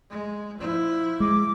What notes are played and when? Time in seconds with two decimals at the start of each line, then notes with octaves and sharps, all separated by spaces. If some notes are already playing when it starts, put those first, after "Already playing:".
0.10 G#3
0.58 F3 E4
1.20 G#3 D6